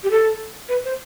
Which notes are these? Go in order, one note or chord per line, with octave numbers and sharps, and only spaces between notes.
G4
A4
B4
C5